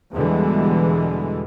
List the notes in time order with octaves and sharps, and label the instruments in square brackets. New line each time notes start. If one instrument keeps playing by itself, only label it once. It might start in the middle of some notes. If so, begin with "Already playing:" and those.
[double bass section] E2 B2 D3 E3 G3 G#3